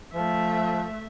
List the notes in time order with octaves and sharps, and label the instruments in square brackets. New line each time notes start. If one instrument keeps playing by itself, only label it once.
[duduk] F3 [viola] A3 E5